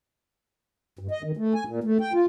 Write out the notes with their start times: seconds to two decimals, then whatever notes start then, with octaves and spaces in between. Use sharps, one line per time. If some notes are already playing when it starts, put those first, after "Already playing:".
0.99 G2
1.11 D#5
1.23 D#3
1.37 A3
1.54 G#5
1.66 A#2
1.84 A3
2.01 G5
2.13 F4